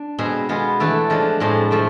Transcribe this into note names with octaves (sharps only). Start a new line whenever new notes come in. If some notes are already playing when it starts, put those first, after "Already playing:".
Already playing: D4
B2 G#3 C4 G#4
G#3 B3 F4 G#4
E3 A3 D4 A4
F3 G#3 D4
A2 F3 G#3 C4
F3 A3 C4